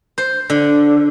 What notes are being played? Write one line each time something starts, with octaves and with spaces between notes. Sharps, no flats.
C5
D3